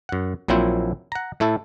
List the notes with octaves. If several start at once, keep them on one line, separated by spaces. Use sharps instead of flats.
F#2 F#5
A#1 A#2 F#3 C4 E4 C5
F#5 A#5
A2 A3 E4 A4